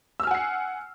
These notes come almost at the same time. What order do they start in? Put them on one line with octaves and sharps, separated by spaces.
E6 F6 G#5 F#5 C7